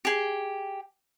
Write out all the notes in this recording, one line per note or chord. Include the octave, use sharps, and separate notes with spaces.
G4 G#4